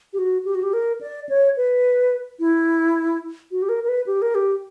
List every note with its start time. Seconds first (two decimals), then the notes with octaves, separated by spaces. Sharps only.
0.13 G4
0.18 F#4
0.45 G4
0.55 F#4
0.63 G4
0.73 A#4
1.01 D5
1.29 C#5
1.57 B4
2.40 E4
3.51 F#4
3.62 G4
3.69 A#4
3.84 A#4
3.88 B4
4.06 G4
4.22 A#4
4.35 G4